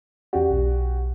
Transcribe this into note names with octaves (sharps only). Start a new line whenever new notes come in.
E2 C#4 F#4 G4 D5
B1